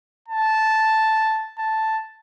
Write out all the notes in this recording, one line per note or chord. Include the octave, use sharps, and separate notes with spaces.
A5
A5